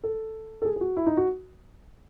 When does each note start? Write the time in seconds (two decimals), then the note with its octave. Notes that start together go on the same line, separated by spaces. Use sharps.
0.04 A4
0.62 A4
0.65 G#4
0.76 G#4
0.81 F#4
0.97 E4
1.07 D#4
1.17 F#4